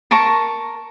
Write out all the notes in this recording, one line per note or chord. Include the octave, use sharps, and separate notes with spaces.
A#4 A5 A#5 C#6